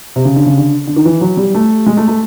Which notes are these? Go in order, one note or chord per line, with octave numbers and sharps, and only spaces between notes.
C3
C#3
D3
C#3
D3
D3
D#3
E3
F#3
G3
A3
G#3
A3
A3